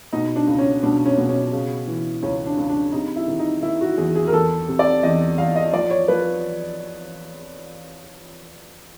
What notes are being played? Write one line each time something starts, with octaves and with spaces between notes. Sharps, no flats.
B2 D#4
D4
C#2
C#4
B2 D4
C#4
B2
C#4
C#3
E3
C#2 C#4
D4
C#2
D4
C3 D#4
E4
D#3
D#4
D#3 E4
F#4
E2 G#4
G#4
A#4
E2 A4
C3
D5
E2 D#5
E2 F5
D#5
F3 D5
C#5
F3 B4